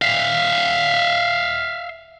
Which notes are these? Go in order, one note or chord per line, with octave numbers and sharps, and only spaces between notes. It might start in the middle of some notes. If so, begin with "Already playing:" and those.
E5 F5